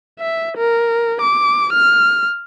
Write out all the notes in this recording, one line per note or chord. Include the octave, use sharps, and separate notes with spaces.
E5
A#4
D6
F6